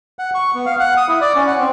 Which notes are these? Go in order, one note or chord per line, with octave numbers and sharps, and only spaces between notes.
F#5
C#6
B3
F5
F#5
D#6
E4
D5
C#4
F#5
C4